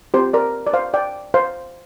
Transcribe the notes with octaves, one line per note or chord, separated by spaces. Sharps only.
C4 F4 G4 C5
A#4 D5
D5
C5 F5
D5 G5
C5 F5